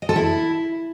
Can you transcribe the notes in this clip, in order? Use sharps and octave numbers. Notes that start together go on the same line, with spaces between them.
D#5
A4
E4